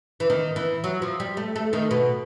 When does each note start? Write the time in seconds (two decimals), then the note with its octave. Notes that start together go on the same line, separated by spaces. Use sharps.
0.20 E3
0.30 D#3
0.56 E3
0.84 F#3
1.02 F3
1.20 G3
1.37 A3
1.56 A3
1.73 D#3
1.91 B2